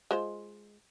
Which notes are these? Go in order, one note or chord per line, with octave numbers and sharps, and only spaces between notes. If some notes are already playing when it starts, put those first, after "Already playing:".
G#3 F4 C5